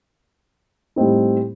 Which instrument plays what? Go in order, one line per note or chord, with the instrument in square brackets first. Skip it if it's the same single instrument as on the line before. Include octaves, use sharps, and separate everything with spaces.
[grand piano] A2 G3 C4 D#4